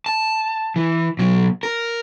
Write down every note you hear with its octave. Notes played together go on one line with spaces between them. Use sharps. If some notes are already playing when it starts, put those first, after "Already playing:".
A5
E3
B2 F#3
A#4